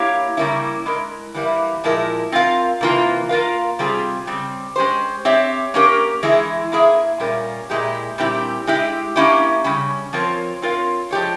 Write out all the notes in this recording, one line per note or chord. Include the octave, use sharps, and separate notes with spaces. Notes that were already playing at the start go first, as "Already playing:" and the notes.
Already playing: A#3 E4 G4 C#5 F5
C#3 G3 A#3 C#4 E4
G#3 E4 A#4
E3 G3 A#3 E4
A#2 F3 G#3 E4 A#4
C4 F4 A#4 F5
C3 E3 A#3 F4
A#3 F4 A#4 F5
C3 G3 C4 F4 G#4
C#3 G3 C4
G#3 C#4 G4 C5
C4 G4 C#5 E5
A#3 C#4 G4 A#4
E3 G#3 E4 G#4
A#3 E4 G#4 E5
A#2 G3 C#4 F4 A#4
A#2 G#3 E4 G4
A#2 G3 C4 E4 G4
G#3 E4 G4
A#3 C#4 E4 G4
C#3 G3 C#4
F3 C4 F4 A#4 C#5
C4 F4 A#4 C#5 F5
F3 G#3 E4 G4 C#5